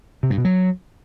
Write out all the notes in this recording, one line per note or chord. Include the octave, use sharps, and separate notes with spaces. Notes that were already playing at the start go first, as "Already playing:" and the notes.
C3
G2
B2
F#3